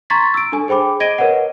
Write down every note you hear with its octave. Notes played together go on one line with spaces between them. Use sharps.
A#5 C6 C#6 G#6 A6 B6
E6 D7
D4 A4 G#5
G#4 C5 G5 B5 D6
D#5 G#6 A#6 D7 D#7 G7
A#4 B4 C#5 D#5 F#5